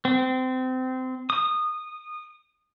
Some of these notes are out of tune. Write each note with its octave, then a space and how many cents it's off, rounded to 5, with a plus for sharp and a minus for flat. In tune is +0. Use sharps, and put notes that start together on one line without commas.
C4 -25
D#6 -20